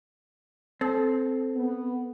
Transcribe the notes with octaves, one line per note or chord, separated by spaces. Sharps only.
C4 A4
B3